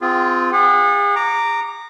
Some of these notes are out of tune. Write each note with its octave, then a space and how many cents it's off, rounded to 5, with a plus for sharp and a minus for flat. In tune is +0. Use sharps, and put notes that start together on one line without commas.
C4 -30 F4 +0 G#4 -15
G#4 -40 F#5 -35
A#5 -10 D6 +0